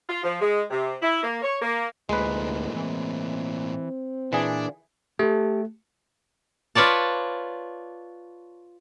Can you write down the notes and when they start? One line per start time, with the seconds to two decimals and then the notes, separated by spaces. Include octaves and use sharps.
0.08 F4
0.23 F3
0.40 G#3
0.70 C3
1.02 E4
1.22 A#3
1.42 C#5
1.61 A#3
2.09 F1 D2 A2 G#3 A#3 B4
2.75 E3 C4
4.33 A#2 E3 D4 G#4
5.19 A3 G4 A4
6.75 F4 B4 C#5 D5 A5